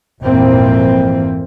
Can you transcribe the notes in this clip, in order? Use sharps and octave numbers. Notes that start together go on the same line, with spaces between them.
G#1 F2 A#2 E3 A#3 C4